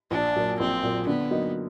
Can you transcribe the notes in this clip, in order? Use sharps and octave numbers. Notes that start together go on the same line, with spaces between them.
A#1 D4
A#2 F#3 A#3
A#1 C4
A#2 F#3 A#3
D3 B3
F#3 A#3 D#4